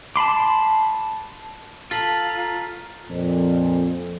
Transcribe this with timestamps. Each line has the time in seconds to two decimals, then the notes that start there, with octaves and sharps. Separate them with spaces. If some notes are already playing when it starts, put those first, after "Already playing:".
0.16 A5 B5 C6 D6
1.91 F4 A4 A#5 A6 B6 F#7
3.10 F2 A#2